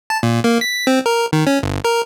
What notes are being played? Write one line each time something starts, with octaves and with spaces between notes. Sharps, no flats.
A5
A#2
A#3
B6
C4
A#4
D#3
C#4
G1
A#4